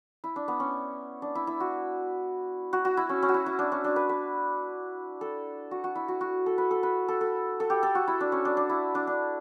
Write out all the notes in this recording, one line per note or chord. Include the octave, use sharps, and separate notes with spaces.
E4
D4
B3
C#4
D4
E4
E4
F#4
F#4
F#4
E4
C#4
C#4
F#4
E4
E4
D4
C#4
D4
B4
B4
A4
F#4
F#4
E4
F#4
F#4
A4
B4
A4
B4
A4
A4
A4
G4
A4
F#4
E4
D4
C#4
D4
D4
E4
D4
D4